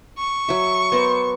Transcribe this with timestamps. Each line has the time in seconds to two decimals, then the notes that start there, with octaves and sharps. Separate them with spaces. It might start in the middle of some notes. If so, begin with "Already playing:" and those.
0.18 C#6
0.49 F#3 E5
0.92 B3 A#4 C5